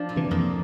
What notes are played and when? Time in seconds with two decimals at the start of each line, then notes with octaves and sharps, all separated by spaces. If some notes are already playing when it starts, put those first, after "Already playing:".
Already playing: F3 C4 D4
0.09 A#2
0.16 C3 E3
0.31 F2 A#3